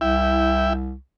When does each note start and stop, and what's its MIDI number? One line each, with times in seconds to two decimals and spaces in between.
0.01 0.95 36
0.01 0.73 64
0.01 0.73 76
0.01 0.73 79